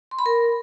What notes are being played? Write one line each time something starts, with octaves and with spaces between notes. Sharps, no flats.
C6
B5
A#4